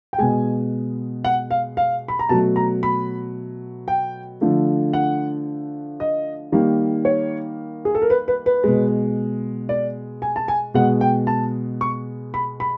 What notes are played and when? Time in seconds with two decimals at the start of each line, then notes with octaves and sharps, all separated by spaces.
0.13 G5
0.18 B2 G#3 G#5
1.25 F#5
1.51 F5
1.77 F5
2.08 B5
2.19 A#5
2.29 B2 F#3 A3 A5
2.56 A#5
2.83 B5
3.88 G5
4.41 D3 F3 A3
4.93 F#5
6.00 D#5
6.52 D#3 G3 A#3
7.05 C#5
7.85 G#4
7.95 A4
8.02 A#4
8.10 B4
8.28 B4
8.46 B4
8.64 B2 G#3
9.69 D5
10.22 G#5
10.36 A5
10.48 G#5
10.74 B2 G#3 F#5
11.01 G5
11.27 A5
11.81 C#6
12.34 B5
12.60 B5